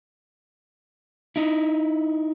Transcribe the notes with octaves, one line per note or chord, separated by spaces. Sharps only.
D#4 E4